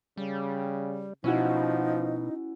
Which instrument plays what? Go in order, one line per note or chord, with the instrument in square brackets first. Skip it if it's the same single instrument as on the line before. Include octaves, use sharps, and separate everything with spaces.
[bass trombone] C#3 [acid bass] G3
[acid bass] B2 [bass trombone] F3 [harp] C#4 E4 F#4 [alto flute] D#4